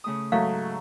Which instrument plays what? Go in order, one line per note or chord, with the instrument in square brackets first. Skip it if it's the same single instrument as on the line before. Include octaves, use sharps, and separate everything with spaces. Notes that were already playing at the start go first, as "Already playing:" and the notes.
[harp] C#3 A3 D#6
[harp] G#2 [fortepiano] F#3 A3 [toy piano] F5